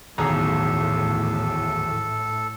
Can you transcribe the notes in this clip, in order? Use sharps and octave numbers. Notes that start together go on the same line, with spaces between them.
D1 B1 E2 A2 D#3 G#4 A4 A#5